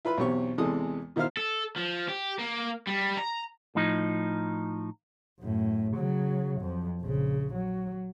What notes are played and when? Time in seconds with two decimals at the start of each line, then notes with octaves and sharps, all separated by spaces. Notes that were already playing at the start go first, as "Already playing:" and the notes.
0.05 E4 F4 B4 B5
0.18 B1 E2 C4 G4 C#5 C#6
0.58 E2 C3 E3 G#3 A4 D#6
1.16 B2 D#3 E4 C5 F5 F6
1.37 A4
1.77 F3
2.09 G4
2.39 A#3
2.87 G3
3.17 A#5
3.75 A2 F3 D#4
5.40 F#2 A2
5.95 C#3 F#3
6.61 F2 F3
7.02 A#1 C#3
7.54 F#3